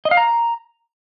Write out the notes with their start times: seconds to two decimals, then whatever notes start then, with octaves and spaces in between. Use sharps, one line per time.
0.05 D#5
0.11 F5
0.17 A#5